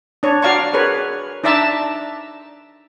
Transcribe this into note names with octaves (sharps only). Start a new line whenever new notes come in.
D4 C#5
F#4 D5 F5 A#5 C#6
G#4 A#4 B4 C#5
D4 D#4 D5 E5 A5 A#5